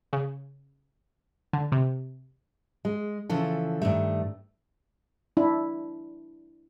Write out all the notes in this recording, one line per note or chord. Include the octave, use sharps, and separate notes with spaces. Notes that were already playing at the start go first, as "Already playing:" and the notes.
C#3
D3
C3
G#3
C#3 E3 F3 A4
G2 D#3 A3
D4 E4